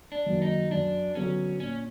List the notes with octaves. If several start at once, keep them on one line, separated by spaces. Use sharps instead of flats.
D4
F#2 D#3 F#3 A#3
D#4
F#2 D4
D3 F#3 B3 C#4
A#2 C#4